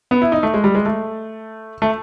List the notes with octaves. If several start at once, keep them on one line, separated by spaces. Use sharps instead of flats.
B3
E4
D#4
A3
G#3
G3
G#3
A3
A3